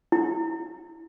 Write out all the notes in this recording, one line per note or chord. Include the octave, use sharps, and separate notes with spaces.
E4